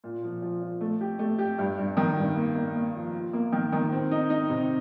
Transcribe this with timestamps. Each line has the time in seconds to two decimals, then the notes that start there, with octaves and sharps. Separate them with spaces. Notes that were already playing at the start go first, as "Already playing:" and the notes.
0.04 A#2
0.23 F3
0.42 F3
0.62 F3
0.81 A3
1.01 G4
1.19 A3
1.38 G4
1.58 G2
1.78 G2
1.97 D#3
2.17 G2
2.36 A#3
2.55 A#3
2.75 A#3
2.95 F3
3.14 F4
3.33 A#3
3.52 D#3
3.72 D#3
3.92 C4
4.11 D#4
4.30 D#4
4.50 C3